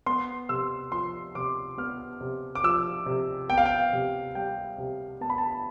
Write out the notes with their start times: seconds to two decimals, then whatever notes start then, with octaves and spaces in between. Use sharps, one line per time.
0.06 B3 C6
0.49 C3 E6
0.92 F3 C6
1.35 C3 D6
1.78 B3 F6
2.21 C3
2.55 D6
2.63 F3 E6
3.06 C3
3.50 B3 G5
3.58 F5
3.66 G5
3.93 C3
4.35 G3 G5
4.78 C3
5.21 B3 A5
5.30 B5
5.38 A5